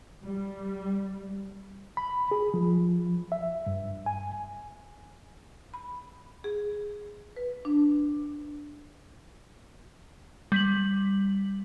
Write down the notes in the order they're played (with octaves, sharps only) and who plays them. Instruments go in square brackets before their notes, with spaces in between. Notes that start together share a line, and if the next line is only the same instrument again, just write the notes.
[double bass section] G3
[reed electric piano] B5
G#4
F3
E5
G2
G#5
[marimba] B5
G#4
B4
D4
[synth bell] G3 B6 F#7